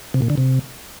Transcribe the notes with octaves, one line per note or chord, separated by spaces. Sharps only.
C3
A#2
D3
C3